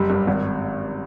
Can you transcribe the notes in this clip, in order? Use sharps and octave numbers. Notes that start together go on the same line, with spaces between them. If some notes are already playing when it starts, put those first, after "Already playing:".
Already playing: F#1 G3
G2
G#1